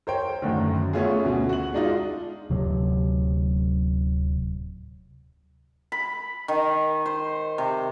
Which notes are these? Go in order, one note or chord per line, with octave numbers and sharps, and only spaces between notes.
A#4 C5 C#5 G5
F#2 A2 D3 D#3
A3 B3 C#4 F4 F#4 G#4
D2 B2
F#4 F#7
G#3 D4 D#4 F4
D1 C3 F#3
B5
D#3
C5
C3